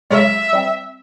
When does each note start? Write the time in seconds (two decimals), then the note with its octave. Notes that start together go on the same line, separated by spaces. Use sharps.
0.10 C#3 F#3 G#3 E5
0.53 G3 C4